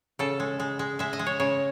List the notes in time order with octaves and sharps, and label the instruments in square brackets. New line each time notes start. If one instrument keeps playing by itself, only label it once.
[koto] C#3 A4
G#3
G#3
G#3
G#3 E5
D#5
G#3
C#5
C#3 C#5